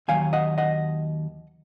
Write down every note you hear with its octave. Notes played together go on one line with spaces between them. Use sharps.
D#2 D#3 F#3 F5 G#5
D#5 F#5
D#5 F#5